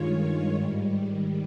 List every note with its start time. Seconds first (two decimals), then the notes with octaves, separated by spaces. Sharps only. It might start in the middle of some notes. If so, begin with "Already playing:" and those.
Already playing: G2 D#3 G#3 F4 C#5
0.53 G#2 D#3 G3